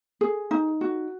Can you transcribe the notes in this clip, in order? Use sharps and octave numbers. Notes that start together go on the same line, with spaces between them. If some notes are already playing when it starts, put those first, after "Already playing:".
G#4
D#4
F#4